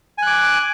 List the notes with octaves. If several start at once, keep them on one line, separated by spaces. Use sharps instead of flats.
G#5 D6 F#6